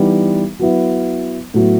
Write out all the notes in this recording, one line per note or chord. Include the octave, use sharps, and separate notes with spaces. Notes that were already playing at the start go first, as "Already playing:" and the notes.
Already playing: E3 G3 B3 D#4
F#3 B3 E4
A2 F#3 B3 E4